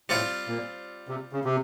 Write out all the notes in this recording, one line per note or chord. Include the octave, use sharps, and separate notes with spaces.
A2 G3 C4 F4
A#2
C3
C#3
C3